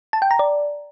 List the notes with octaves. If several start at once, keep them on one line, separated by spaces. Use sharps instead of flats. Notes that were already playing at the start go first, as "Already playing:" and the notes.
A5
G5
A#5
D5